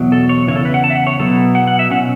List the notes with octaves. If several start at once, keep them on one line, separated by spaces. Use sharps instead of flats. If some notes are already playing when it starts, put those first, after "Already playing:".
Already playing: E2 B2 F#3
A4
C#5
E2 C#3 E4 A4 C#5
B4
F#5
A5
E5
F#5
C#5
B2 F#3 B3 E4 A4
F#5
F#5
E5
B2 F#3 C#4 F#5